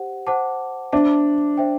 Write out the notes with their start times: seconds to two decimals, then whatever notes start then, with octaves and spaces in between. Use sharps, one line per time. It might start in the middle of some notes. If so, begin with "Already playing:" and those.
Already playing: G4 C5 F#5
0.27 C5 F#5 A5 D6
0.93 D4 C5 E5 A5 D6
1.58 C5 E5 G5